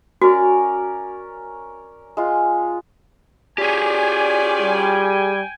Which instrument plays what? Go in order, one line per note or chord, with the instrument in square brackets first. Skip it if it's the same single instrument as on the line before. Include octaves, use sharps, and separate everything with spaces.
[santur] C#4 A#4 D5 [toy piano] F#4
[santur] G#3 F4
[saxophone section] C#4 F4 D5 [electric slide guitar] G4 G#4 [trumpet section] G5 G#5
[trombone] G3